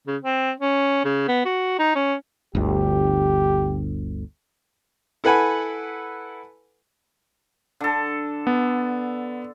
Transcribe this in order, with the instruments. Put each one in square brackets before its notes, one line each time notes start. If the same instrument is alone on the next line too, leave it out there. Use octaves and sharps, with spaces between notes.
[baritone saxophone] C#3
C4
C#4
C#3
B3
F#4
D#4
C#4
[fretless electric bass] G1 D2 [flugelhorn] G4
[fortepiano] E4 A4 B4 F#5 G#5 B5
[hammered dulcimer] D3 A4
[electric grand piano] B3